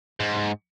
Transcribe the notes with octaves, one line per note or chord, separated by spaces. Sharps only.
G#2